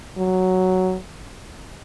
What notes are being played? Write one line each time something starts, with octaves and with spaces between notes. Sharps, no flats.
F#3